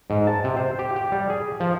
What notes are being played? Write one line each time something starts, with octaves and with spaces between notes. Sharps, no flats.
G#2
A5
C3
C5
G4
G4
G3
G#4
F3